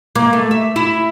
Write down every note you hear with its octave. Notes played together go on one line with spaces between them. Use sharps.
A#3
A3
E5
E4